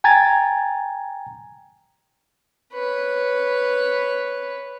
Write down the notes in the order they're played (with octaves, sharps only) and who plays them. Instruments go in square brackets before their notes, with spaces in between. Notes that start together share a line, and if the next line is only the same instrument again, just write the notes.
[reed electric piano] G5 G#5 A#5 G#6 A6
[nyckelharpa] B4 C#5